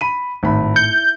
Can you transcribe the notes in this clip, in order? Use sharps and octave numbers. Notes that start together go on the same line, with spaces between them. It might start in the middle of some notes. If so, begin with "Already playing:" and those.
B5 D#7
G#1 A2 B5
G6 C#7